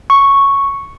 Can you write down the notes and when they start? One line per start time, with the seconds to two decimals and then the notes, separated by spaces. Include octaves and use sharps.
0.10 C#6